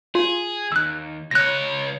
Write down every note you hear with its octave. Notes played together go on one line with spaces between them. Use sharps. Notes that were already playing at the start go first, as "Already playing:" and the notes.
F4 G#4
D#2 E6 F#6
C#2 C#5 F#6 A#6